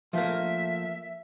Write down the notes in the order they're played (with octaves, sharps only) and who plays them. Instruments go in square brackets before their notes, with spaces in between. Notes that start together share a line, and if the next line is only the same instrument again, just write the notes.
[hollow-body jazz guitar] F3 A3 A#3 [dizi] E5